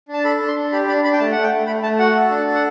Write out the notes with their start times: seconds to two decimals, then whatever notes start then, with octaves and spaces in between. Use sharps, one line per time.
0.08 D4
0.14 A5
0.24 A4 B5
0.40 D4
0.48 C6
0.56 D4
0.72 G4 B5
0.88 D4 B5
1.04 D4 B5
1.13 G5
1.19 A3 A5
1.32 A3 F#5
1.43 G5
1.52 A3
1.67 A3 B5
1.83 A3 A5
1.99 F#4 F#5
2.15 A4
2.30 D4
2.47 A4
2.55 F#5